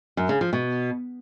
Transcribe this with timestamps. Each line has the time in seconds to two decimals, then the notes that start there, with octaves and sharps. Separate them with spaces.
0.17 F#2
0.29 C#3
0.41 F3
0.53 B2